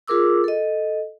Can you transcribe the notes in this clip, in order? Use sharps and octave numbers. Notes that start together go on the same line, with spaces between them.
F4 G#4 A#4 D6 E6
A4 D#5